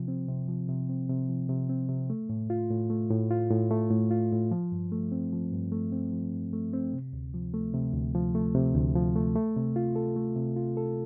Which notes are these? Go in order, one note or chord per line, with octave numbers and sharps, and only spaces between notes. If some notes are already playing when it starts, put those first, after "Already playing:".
Already playing: C3 F3
C4
C3
F3
C3
C4
C3
F3
C3
C4
C3
A3
A2
F4
A2
A3
A2
F4
A2
A3
A2
F4
A2
F3
G2
A3
C4
F3
G2
A3
C4
F3
G2
A3
C4
C3
D2
F3
A3
C3
D2
F3
A3
C3
D2
F3
A3
A3
C3
F4
A4
A3
C3
F4
A4